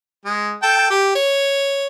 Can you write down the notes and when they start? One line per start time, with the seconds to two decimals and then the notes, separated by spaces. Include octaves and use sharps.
0.24 G#3
0.63 A4 G5 A5
0.90 G4
1.15 C#5